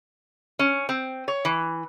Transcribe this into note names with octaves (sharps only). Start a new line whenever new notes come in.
C#4
C4
C#5
E3